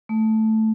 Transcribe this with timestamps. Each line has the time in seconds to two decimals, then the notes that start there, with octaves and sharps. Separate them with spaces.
0.09 A3